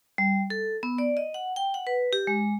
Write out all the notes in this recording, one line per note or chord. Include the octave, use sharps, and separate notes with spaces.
G3
A4
B3
D5
D#5
F#5
G5
F#5
B4
G4
G#3